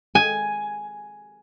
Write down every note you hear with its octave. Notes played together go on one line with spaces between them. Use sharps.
G#5